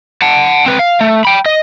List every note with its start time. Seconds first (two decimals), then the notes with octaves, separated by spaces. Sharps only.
0.22 F#5 A5
0.66 C4 B4
0.79 F5
1.01 A3
1.25 G5 B5
1.46 D#5